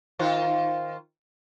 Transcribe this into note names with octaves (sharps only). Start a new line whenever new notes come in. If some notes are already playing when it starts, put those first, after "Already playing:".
D#3 F4 C5